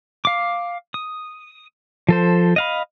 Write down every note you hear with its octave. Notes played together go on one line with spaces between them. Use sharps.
F5 D6
D#6
F3 A4 C5
D#5 F5 B5